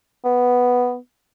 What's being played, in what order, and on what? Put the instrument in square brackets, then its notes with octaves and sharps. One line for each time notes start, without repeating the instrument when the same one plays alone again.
[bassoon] B3